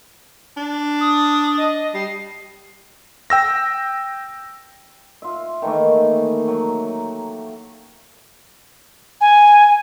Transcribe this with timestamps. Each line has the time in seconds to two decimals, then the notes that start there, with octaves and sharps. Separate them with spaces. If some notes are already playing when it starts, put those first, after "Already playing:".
0.57 D4
1.00 D#6
1.57 D#5
1.94 G3 C7
3.30 G5 E6 A#6
5.22 F4 E5
5.62 D#3 E3 A3 A#3
6.48 F#3
9.21 G#5